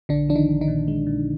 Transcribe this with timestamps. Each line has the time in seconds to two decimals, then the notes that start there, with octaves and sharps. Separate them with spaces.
0.09 A#1 D3 D4
0.29 F3 D4
0.35 D#3 D#4
0.49 A#1
0.61 D#3 D#4
0.68 A#2
0.88 G#3
1.06 A#2